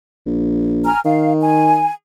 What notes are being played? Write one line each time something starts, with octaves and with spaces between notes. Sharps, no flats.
A#1
G#5 A#5 F6
D#3 F5
G#5